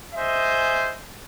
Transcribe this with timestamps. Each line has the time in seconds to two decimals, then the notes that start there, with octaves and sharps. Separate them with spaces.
0.15 G#4 C5 D#5 E5